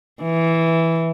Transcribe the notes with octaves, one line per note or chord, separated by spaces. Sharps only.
E3